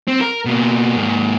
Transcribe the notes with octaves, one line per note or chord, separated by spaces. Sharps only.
C4
A#4
B2 A#3
G#2 A#3